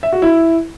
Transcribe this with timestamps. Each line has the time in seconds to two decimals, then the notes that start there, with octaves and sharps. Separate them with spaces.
0.03 E5
0.12 F#4
0.22 E4